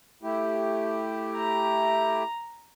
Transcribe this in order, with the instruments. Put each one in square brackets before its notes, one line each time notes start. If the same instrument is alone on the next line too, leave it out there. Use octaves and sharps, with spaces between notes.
[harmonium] A3 E4 G4
[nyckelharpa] A#5